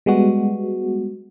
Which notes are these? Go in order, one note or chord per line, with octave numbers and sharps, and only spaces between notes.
G3 G#3 B3 F#4